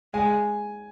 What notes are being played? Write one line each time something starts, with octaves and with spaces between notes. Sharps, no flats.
G#3 G#5